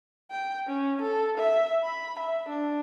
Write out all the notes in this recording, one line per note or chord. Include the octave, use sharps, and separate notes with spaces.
G5
C#4
A4
E5
B5
E5
D4